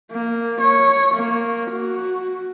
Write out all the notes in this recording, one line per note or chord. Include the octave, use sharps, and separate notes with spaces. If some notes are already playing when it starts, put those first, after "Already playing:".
A#3
C#5
A#3
F#4